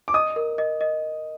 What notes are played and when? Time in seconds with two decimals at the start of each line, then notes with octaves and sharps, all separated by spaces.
0.08 D6
0.14 D#5 D#6
0.36 A#4
0.58 D#5
0.81 D#5